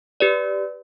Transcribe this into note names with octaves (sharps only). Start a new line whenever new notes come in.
G4 B4 D5